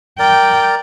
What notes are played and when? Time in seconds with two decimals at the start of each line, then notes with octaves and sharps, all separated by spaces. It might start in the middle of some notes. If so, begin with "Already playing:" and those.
0.19 A#4 D5 G5